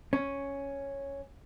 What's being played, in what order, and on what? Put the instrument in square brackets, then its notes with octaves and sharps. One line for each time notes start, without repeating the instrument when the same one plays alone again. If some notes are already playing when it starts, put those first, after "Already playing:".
[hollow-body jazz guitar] C#4